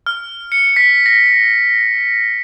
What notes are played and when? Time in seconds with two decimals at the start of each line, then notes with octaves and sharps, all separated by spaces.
0.06 F6
0.52 C#7
0.76 B6
1.06 A#6